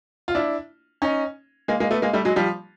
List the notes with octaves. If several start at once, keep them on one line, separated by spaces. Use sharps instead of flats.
F4
D4 E4
C#4 D#4
G#3 A#3
G#3 A#3
A3 B3
G#3 A#3
G3 A3
F#3 G#3
F3 G3